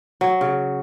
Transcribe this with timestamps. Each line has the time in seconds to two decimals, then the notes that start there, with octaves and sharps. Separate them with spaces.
0.21 F#3
0.41 C#3